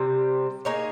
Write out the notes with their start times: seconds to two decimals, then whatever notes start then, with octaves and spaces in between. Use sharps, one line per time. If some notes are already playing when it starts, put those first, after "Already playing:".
Already playing: C3 G3 C4
0.65 A#3 D#4 G#4 C#5